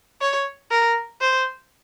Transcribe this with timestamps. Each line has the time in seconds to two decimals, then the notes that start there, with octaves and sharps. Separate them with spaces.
0.21 C#5
0.71 A#4
1.21 C5